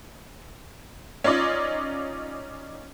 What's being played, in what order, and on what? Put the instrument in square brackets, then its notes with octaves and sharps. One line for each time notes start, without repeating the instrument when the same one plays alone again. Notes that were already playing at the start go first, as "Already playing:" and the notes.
[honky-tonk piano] C#4 D#4 F4 D5 D#5